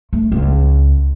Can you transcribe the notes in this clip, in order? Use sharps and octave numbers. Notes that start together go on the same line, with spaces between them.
A3
C#2